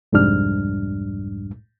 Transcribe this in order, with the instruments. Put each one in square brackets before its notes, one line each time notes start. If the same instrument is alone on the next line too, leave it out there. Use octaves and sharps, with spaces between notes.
[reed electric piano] C2 F2 G#2 G3 D4 F6